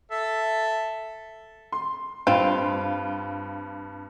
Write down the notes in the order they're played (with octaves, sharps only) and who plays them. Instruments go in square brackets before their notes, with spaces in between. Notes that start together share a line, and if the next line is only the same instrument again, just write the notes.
[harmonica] A4 E5
[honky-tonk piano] C6
[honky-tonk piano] G2 [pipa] C4 F4